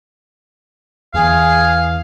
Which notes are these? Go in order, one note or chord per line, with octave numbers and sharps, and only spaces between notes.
E2 E3 G#4 F5